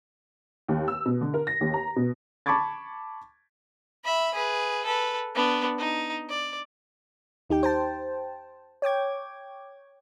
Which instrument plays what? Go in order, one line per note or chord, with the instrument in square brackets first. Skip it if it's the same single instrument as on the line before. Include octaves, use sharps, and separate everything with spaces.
[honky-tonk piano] D#2
E6
B2
D3
A#4
A#6
D#2
A#5
B2
[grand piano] A5 B5 C#6 D6 G#6 A6
[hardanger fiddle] E5 B5
G#4 B4
A4 B4
B3 D4
D#4
D5
[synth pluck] D#2 D#4 G4 G5
C5 G5 A5
C#5 G5 D6 G#6